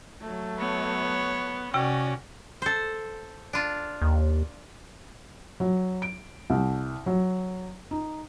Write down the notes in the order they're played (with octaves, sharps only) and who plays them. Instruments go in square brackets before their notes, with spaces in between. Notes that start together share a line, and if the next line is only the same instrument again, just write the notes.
[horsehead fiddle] F#3 A3
[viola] B3 C#5
[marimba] C3 G5 [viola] C#4 [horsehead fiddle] F#4 D5
[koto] A4 C5
D4 F4
[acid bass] D#2
[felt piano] F#3
D7
C2
F#3
D#4